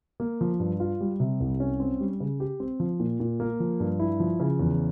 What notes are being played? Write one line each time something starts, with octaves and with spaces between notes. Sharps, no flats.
A#3
F3
G2
F4
G3
C3
C2
C#4
C4
G3
C#3
G4
C4
F3
A#2
A#2
A#3
F3
G2
E4
F3
C#3
E2